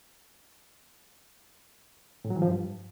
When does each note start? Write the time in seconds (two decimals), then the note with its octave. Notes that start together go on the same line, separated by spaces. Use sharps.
2.25 A2
2.30 F#3
2.36 E3
2.42 F3
2.48 G2